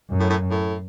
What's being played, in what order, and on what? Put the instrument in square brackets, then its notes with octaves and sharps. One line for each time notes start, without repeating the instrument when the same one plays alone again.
[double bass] F#2
[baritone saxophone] A2
A2
A2